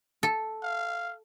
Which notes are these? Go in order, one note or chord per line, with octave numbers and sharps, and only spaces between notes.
A4
F5